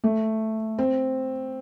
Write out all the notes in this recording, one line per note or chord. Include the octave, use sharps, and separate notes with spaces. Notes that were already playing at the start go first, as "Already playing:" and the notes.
A3
C4